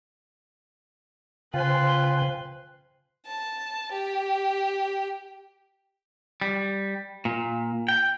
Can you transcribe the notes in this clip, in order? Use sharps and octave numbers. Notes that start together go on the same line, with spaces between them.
C#3 F4 B4 C5 G5 G#5 C6
A5
G4
G3
A#2
G5